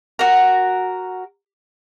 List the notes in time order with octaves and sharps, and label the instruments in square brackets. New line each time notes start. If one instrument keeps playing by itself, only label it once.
[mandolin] F#4 A#4